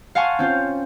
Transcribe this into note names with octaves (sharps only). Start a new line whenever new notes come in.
F5 F#5 G#5 A5 C6 C#6
C4 C#4 F4 C5